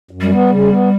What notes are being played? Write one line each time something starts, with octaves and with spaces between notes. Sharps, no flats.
F#2
G3
B3
C#3
B3